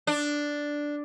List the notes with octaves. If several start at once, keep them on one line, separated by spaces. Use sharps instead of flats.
D4